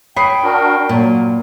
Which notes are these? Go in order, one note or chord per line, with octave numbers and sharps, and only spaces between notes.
C#5 G5 B5 D#6 C7
D4 F#4 A#4
A#2 F#3